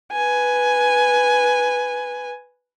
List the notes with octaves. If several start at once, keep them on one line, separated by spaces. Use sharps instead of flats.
B4 G#5